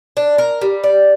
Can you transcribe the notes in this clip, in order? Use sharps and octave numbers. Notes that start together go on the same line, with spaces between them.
D4
A#4
G3
D5